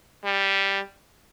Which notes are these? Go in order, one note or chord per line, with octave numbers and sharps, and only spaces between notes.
G3